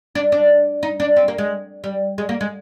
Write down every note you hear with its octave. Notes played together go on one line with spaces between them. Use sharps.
D4
D4
D#4
D4
C4
A#3
G#3
G3
G#3
A#3
G#3